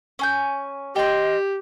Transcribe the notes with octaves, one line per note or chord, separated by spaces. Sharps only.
C#4 G#5 G6
G4 D#5 G5 C6